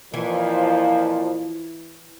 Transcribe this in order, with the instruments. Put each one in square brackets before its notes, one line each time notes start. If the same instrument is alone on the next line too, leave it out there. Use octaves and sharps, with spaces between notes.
[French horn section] F2 A#2 F3 [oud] E3